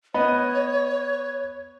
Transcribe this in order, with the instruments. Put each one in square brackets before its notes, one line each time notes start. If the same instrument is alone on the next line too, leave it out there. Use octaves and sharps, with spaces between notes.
[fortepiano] B3 D#5 [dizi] C#5